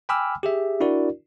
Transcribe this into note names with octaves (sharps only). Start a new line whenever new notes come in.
G5 G#5 B5 D6 E6 F6
G4 G#4 E5
D4 E4 F#4 A#4 D5